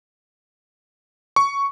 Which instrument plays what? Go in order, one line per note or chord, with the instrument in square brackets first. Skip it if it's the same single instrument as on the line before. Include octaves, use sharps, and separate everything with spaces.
[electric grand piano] C#6